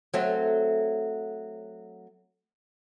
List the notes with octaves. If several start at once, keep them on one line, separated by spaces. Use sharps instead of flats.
F#3 A3 C4